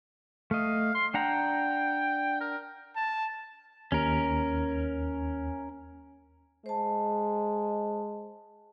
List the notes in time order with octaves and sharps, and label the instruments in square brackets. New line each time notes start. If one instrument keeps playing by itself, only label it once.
[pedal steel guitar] A3 D#5 [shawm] F5
[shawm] C6
[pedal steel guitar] D4 F#5 A#5 [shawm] G5
[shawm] A#4
[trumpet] A5
[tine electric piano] D#2 [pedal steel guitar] C#4 A#4
[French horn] G#3 [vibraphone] C5 A5